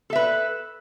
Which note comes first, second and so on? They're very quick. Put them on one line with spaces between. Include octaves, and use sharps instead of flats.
A4 E5 B4